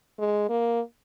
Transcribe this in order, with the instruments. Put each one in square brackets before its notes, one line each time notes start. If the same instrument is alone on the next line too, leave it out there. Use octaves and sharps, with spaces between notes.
[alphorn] G#3
A#3